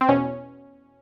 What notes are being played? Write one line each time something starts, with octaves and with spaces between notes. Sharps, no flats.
C4
E2 B2 C#4